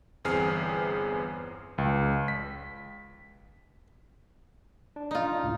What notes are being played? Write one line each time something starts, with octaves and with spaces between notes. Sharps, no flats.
G1 E2 C4 G#4 F6 C7
C#2
B6
D4
D#4 F4
C#2 A2